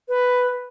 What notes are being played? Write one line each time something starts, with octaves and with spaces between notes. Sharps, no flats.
B4